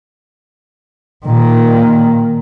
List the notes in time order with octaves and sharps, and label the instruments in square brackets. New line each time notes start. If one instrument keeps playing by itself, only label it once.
[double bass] A#2 D#3